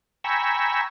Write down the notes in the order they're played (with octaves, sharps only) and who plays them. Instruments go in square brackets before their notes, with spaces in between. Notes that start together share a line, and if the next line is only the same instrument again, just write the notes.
[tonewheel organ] G5 G#5 A#5 B5 C#6 E6